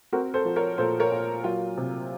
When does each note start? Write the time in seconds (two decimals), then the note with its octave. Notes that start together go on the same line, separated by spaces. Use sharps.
0.13 C4 F#4 A#4
0.34 A4 C5
0.45 F3
0.56 A#4 C#5
0.78 A#2 A4 C5
1.00 A#4 C#5
1.12 A#2
1.44 F#3 F4
1.77 C3